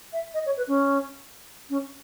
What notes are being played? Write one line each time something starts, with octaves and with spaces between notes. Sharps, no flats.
E5
D#5
C#5
B4
C#4
C#4